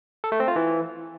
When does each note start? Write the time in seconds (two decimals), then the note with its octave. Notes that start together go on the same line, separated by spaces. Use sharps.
0.24 A4
0.32 A3
0.40 C4
0.48 F4
0.56 E3